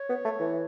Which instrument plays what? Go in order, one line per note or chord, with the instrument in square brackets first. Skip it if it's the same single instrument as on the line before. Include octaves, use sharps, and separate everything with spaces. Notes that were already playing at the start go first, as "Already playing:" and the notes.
Already playing: [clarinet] C#5
[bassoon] B3
A3
E3